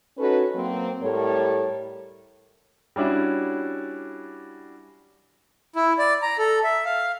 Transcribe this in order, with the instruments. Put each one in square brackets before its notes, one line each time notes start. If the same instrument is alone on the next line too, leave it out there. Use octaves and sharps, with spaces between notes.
[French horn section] C#4 D#4 F#4 A4 B4 C#5
F#3 A#3 C4
A2 G3 A3 A4 A#4 C#5
[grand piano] G3 C#4 D4 E4 F#4
[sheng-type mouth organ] E4
D5
A#5
A4
E5
F5